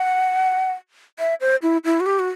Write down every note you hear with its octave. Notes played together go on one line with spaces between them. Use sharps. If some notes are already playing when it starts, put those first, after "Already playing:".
Already playing: F#5
E5
C5
E4
E4
F#4
G4
F#4